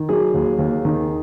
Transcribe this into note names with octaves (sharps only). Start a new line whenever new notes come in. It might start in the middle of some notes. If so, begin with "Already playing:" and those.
Already playing: D#3
F#3 G#4
D#2
D#2
D#3